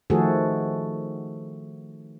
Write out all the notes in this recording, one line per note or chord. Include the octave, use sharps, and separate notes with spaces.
D#3 F3 A3 F#4 G#4 A4